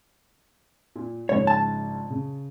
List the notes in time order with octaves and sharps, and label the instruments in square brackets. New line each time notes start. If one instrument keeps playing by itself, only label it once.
[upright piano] A#2
[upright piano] A#1 G#2 C#3 [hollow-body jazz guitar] C#5
[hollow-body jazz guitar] A5
[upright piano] C#3